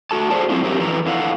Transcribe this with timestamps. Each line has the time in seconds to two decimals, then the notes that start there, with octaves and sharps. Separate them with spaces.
0.11 A3 F#4 A4 A5
0.30 G#4 A4 C5 D5 A5
0.50 F#3 C4 E4 F4
0.63 F#2 F#3 G4 A#4
0.79 F2 E3 E4 B4 A#5
1.06 F2 E4 A4 F5 F#5